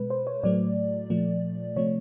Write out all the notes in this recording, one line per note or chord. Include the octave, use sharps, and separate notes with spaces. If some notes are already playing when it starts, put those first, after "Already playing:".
Already playing: B2 G#3 B4
C5
C#5
A2 F#3 A3 D5
A#2 F3 A3
C3 F3 A3 C#5